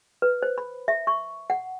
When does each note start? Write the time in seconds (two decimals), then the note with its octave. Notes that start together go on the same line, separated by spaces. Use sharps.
0.22 B4
0.43 C5
0.58 B5
0.88 E5
1.07 C#6
1.50 F#5